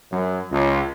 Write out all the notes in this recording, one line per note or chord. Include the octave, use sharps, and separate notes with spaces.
F#2
C#2